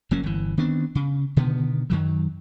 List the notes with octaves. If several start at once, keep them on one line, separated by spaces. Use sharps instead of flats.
F#1 F#3 A#3 C#4
G1 E3
D#3 B3 C4 D4
C#3
B2 D3 D#3 B3
F#2 D#3 F#3